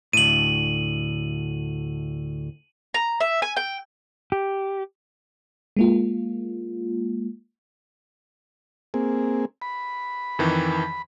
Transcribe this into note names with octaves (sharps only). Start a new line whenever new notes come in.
D2 A2 D#7 F#7
A#5
E5
G#5
G5
G4
G#3 A#3 F4
A#3 C4 G#4
B5
F2 D#3 E3